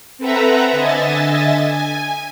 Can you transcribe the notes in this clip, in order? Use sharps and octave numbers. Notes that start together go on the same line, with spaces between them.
C4 A4 B4 E5 F#5 A#5
D3 D#5 E5 G#5 A6
G#5